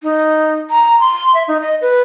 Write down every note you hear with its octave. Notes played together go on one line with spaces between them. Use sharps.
D#4
A#5
C6
E5
D#4
D#5
B4